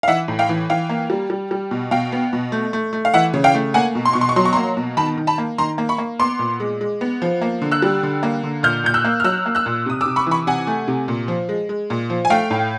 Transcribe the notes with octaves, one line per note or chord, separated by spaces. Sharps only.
F5
E3 E5 F#5
A2
F5 G5
E3
E3 F5 G5
A#3
G3
G3
G3
B2
B2 F5 G5
B3
B2
A3
A3
A3
F5
E3 E5 F#5
C#3
F5 G5
A3
A#3 F#5 G#5
B2
C6
B2 C#6
C6
C#6
F#3 C6
C#6
A#3 A#5 C6
B2
D#3 A5 B5
D#3
A5 B5
A#3
D#3 A#5 C6
A#3
B5 C#6
A#3
B3 C6 D6
A#2
G#3
G#3
B3
F3
A#3
D3
E6 F#6
G3
D3
A#3
D3
A#2 F6 G6
A#2 G6
E6 F#6
A#3
F6
F#3 E6 F#6
A#3
E6 F#6
A#2
C3 D#6
D6 E6
C3
B5 C#6
E3
B5 C#6
C3 F#5 G#5
A3
C3
A#2
F3
G#3
G#3
A#2
F3
G#5
A3 F5 G5
A2